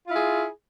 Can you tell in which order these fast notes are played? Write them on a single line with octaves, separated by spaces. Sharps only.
F4 E4 G#4